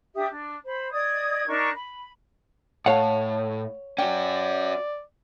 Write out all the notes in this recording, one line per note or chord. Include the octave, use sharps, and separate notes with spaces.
D4 G4 E5 D#6
D4
C5 B5
D5 D#5 D#6 G#6
D4 D#4 A#4 C#6
B5
A2 C#5 F5 F#5 A5
C#4 F#4 D5 G5